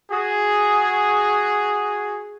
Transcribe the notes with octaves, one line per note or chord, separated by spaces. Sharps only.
F#4 G#4